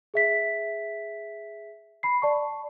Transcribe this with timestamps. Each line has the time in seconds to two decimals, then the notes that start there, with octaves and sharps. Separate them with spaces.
0.14 G#4 E5 B6
2.03 B5 C7
2.22 D5 A5 C#6